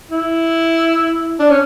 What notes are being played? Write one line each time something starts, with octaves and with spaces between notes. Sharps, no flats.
E4
D4
C#4